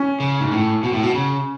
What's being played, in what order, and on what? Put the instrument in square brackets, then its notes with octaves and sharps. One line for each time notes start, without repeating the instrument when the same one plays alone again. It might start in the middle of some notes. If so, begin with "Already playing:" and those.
Already playing: [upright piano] C#4
[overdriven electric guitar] C#3
G#2
A2
B2
A2
B2
C#3